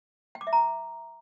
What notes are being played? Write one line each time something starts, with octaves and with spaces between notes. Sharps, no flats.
G5
D6
E5
A#5